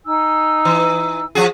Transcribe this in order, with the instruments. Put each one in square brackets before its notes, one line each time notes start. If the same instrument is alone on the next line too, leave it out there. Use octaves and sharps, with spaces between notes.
[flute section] D#4 G#5 E6
[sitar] E3
F3 F#4 G#4